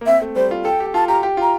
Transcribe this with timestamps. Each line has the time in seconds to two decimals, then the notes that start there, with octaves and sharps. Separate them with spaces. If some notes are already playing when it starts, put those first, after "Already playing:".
0.01 A#3
0.06 C4 E5
0.22 A3
0.36 G3 C5
0.51 F4
0.65 A4 G5
0.80 G4
0.94 F4 A5
1.08 G4 A#5
1.23 G4
1.37 F4 A#5